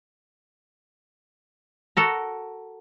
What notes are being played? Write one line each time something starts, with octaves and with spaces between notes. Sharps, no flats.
F#4 A4 A#4